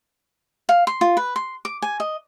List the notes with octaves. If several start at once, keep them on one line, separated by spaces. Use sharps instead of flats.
F5
C6
F4
B4
C6
D6
G#5
D#5